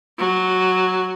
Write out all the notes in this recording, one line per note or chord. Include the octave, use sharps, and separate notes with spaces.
F#3